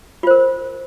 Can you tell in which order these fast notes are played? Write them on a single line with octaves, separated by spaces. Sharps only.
F4 C5 A#4